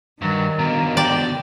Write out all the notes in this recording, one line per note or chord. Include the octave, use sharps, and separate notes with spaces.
G2 D#3 F#3
B2 D3 A#3
D5 G5